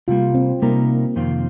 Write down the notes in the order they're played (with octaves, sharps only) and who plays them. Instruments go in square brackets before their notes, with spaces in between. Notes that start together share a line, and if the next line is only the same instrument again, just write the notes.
[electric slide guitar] C3 G3 A#3 [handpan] F4
[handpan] C4
[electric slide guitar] C3 G3 D#4 A#4 [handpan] A#3
[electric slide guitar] F2 C3 D#3 C4 F4